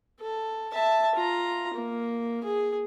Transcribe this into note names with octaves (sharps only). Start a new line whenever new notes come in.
A4
E5 A5
F4 A#5
A#3
G#4